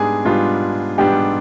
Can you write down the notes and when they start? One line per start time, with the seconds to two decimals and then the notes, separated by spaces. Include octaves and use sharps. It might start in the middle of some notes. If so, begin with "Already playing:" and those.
Already playing: G#2 G3 B3 D4 G#4
0.25 G#2 G3 B3 D4 F4
0.98 G#2 G3 B3 D4 G4